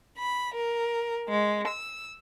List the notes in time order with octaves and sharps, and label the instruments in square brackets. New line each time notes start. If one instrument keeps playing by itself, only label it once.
[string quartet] B5
A#4
G#3
E6